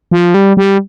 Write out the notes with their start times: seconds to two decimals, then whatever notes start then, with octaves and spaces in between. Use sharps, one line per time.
0.11 F3
0.34 G3
0.57 G3